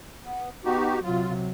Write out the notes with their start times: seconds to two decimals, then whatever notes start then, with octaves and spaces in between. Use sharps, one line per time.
0.24 B3
0.65 B3 D#4 F#4 G4
1.03 C3 F#3 F4